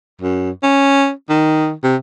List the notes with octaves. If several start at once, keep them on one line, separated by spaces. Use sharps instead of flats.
F#2
C#4
D#3
C3